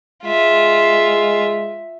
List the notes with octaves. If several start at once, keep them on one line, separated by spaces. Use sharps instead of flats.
G#3 F4 E5